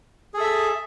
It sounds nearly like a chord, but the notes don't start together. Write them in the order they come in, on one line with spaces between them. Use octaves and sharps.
G#4 A4 E5